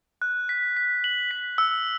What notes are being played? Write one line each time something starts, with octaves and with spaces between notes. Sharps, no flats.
F#6
B6
B6
F#7
B6
E6